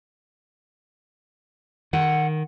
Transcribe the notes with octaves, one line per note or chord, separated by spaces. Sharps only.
D#3 F#5